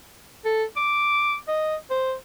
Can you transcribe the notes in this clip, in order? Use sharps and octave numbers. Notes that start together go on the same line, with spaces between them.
A4
D6
D#5
C5